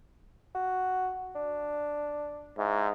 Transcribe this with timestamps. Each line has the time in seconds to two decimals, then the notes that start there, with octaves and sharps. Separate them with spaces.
0.55 F#4
1.35 D4
2.58 G#2 E4